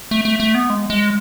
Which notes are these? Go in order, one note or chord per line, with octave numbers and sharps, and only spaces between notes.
A3
A3
A3
B3
G#3
G#3